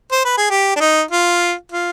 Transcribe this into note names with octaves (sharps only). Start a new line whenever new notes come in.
C5
B4
G#4
G4
D4
D#4
F4
F4